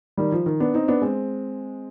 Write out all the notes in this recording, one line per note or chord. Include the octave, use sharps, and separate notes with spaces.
D#3 G3
F3
D#3
B3 D4
C4 D#4
B3 D4
G#3 C4